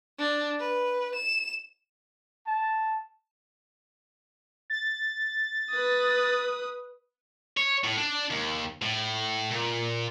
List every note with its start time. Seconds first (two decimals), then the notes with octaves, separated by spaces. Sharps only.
0.19 D4
0.60 B4
1.15 E7
2.46 A5
4.70 A6
5.72 B4 D#6
7.57 C#5
7.84 A2
7.98 D4
8.30 D#2
8.82 A2
9.51 A#2